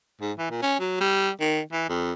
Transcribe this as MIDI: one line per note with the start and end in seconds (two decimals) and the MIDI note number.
0.21 0.32 44
0.38 0.47 52
0.50 0.60 46
0.62 0.76 61
0.80 0.96 54
1.01 1.30 55
1.41 1.60 51
1.72 1.88 52
1.89 2.13 41